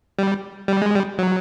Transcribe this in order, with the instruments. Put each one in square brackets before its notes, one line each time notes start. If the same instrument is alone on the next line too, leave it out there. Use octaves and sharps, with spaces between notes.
[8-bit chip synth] G3
G3
G#3
G3
F#3